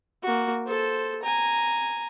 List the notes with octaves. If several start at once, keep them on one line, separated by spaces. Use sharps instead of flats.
A#3 F#4
A4 C5
G#5 A#5